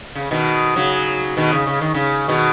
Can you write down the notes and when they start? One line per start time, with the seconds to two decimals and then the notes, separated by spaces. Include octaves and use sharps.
0.15 C#3
0.31 B2 D#3
0.76 C#3 F#3
1.37 B2 D#3
1.53 C#3
1.67 C#3
1.81 D#3
1.94 C#3
2.28 B2 D#3